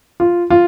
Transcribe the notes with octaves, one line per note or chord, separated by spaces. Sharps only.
F4
F4